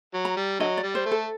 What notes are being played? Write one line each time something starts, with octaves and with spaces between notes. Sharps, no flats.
F#3
A#5
G3
D3 F#3 D#5
D5
G3
C5
A3
A4